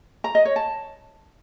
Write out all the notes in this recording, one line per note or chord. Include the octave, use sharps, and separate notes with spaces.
A#5
D#5
C#5
A5